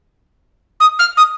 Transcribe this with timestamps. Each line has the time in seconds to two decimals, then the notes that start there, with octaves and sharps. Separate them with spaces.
0.80 D#6
0.99 F6
1.17 D#6